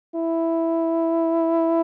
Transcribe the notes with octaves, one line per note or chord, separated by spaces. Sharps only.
E4